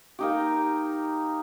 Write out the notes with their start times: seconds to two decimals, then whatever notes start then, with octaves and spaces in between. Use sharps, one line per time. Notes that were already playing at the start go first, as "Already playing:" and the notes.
0.19 A#3 D#4 G4